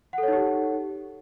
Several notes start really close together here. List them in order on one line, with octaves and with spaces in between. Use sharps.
F#5 A4 C#5 D#4 G4